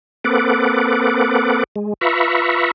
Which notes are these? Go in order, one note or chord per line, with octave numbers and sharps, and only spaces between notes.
A#3 C4 A4 B4 F#5 D6
G#3
F4 B4 E5 A#5 B5 C#6